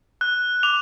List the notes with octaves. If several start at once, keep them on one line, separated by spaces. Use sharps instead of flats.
F#6
D6 F7